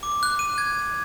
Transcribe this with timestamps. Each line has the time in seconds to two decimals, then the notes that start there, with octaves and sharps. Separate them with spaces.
0.03 D6
0.23 F#6
0.39 D#7
0.58 G#6